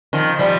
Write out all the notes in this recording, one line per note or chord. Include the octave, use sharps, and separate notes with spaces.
D#3 F3
F3 G3